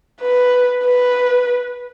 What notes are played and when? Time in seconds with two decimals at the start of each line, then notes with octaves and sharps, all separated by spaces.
0.22 B4
0.84 B4